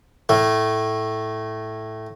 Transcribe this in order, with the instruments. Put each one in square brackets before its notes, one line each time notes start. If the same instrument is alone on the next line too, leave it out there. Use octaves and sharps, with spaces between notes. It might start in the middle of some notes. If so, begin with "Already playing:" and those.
[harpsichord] A2 A3